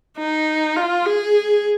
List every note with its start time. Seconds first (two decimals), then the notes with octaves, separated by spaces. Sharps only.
0.18 D#4
0.76 F4
1.06 G#4